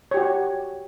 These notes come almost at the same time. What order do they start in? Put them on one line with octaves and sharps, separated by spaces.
C#5 G4 F#4